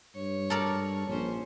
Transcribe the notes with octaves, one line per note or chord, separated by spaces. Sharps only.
G2 C#5
A4 A#4 D5
A#1 C#4 C5